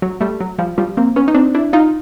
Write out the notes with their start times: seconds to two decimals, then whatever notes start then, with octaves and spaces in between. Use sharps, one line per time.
0.02 F#3
0.21 G3 A3
0.40 F#3
0.58 F3 G3
0.78 F3 G3
0.97 A#3 C4
1.16 B3 C#4
1.28 D#4
1.34 C4 D4
1.55 D4 E4
1.73 D#4 F4